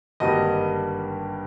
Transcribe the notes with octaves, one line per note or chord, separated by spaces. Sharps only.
G#1 G2 D3 G3 A#3 D#5